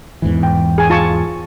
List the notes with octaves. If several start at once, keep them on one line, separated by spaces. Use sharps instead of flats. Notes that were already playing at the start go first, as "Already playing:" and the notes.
E2 G#2 E3
G5
G#4 G#5
F4 A5 C#6